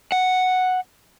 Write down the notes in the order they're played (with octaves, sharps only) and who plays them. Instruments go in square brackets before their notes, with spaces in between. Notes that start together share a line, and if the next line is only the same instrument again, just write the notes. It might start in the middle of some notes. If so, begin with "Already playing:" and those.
[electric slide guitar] F#5